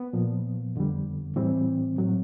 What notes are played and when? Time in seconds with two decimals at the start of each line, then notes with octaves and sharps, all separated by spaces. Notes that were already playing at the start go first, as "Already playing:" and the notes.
Already playing: B3
0.13 A#2 F3
0.76 F2 D3 G3
1.36 A2 E3 G3 C4
1.98 A2 F#3